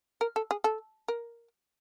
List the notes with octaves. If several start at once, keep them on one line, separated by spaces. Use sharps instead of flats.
A#4
A4
G#4
A4
A#4